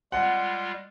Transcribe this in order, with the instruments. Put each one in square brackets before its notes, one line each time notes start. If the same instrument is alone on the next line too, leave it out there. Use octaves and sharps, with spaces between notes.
[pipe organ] G3 G#3 F4 [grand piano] F#5